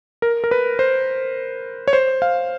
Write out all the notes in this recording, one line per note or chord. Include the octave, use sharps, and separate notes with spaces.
A#4
A#4
B4
C5
C#5
C5
F5